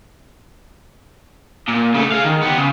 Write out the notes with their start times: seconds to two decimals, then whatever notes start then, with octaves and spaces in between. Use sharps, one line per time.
1.68 A#2
1.94 C#3 A3
2.12 G#4 F5
2.25 D#3
2.42 B3 G4
2.58 C#3